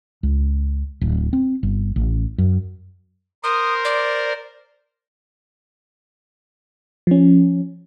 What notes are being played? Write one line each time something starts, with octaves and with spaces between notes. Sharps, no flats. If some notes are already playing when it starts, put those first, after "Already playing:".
C#2
D1
C4
G1
A1
F#2
A#4 C5 D#6
D5
F3 C#4